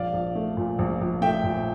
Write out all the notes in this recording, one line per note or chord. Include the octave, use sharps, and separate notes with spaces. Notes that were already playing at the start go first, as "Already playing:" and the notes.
Already playing: A#1 D5 F5
A#1
A3
A#2
A#1
A#1
A3 E5 G5
A#2